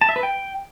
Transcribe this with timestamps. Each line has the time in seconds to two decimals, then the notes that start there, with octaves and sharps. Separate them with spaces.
0.01 A5
0.09 E5
0.16 B4
0.23 G5